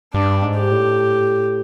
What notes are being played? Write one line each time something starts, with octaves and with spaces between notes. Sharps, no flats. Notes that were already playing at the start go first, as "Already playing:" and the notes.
G2 D4
G#2
G4
A2